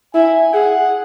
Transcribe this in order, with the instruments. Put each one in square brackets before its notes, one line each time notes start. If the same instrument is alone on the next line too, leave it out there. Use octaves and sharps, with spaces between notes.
[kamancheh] E4 [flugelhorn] G#5
[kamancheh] G#4 [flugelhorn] F#5